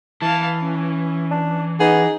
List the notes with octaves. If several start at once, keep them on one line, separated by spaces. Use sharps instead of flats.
E3 F5 A5
C#4
D4
B3 D#4 G#4